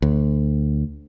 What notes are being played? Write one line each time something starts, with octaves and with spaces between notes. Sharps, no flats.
D2